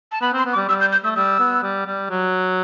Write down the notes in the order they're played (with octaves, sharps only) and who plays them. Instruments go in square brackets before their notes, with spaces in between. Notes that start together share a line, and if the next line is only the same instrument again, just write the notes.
[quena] A5
[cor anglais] B3 [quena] B5
[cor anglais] C4 [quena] C6
[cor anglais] B3
[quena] D6
[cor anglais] G3
[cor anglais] G3 [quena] E6
[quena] G6
G6
[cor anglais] A3 [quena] E6
[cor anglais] G3 [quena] E6
[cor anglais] B3
G3
G3
F#3